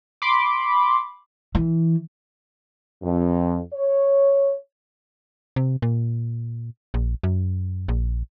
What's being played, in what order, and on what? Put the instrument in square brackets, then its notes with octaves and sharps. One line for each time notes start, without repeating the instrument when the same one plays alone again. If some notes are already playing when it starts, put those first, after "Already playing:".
[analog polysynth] B5 C6 D6
[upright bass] E3
[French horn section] F2
C#5
[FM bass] C3
A#2
A#1
F#2
A#1